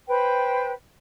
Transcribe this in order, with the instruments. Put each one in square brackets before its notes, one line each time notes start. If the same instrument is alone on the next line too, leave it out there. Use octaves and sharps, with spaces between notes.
[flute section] B4 C5 G5